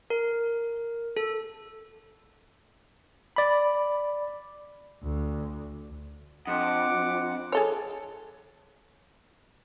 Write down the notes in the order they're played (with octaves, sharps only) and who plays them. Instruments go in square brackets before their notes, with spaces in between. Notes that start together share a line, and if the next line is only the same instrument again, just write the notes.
[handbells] A#4
A4
[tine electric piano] D5 B5
[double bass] D2
[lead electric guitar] F2 [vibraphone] D4 D#5 C6 [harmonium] F#5 [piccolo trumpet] D6
[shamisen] G#4 A4 C#5